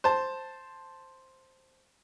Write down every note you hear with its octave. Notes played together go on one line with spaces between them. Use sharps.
C5 A5